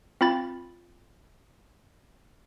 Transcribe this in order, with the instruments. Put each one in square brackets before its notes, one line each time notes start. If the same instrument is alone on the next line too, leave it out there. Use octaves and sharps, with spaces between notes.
[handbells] C4 F4 B5 A6